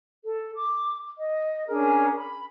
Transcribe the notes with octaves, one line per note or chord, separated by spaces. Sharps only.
A4
D6
D#5
C#4 D4 G#4 A#4
B5